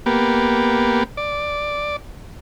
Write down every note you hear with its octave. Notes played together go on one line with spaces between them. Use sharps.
A#3 B3 G4
D5